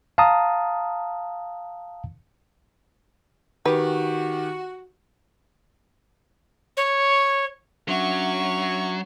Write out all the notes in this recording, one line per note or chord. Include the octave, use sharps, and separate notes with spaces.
F5 A5 A#5 D#6
D#3 F#4 G4 B4
C#5
F#3 C#4 D4 E5 F#5 C#6